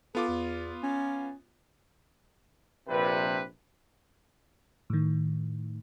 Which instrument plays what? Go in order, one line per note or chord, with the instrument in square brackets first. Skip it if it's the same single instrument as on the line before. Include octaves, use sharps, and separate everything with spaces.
[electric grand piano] B3 F4 D6 [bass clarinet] A4
[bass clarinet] E2
C#4
[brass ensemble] A#1 C3 B4
[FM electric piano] A2 D#3